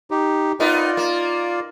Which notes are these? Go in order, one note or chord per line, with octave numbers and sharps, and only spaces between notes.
D#4 G4
B3 D#4 F4 A#4 D5
A#3